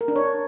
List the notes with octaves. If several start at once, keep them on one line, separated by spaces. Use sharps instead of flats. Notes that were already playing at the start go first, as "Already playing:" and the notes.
A#4
D4
C#5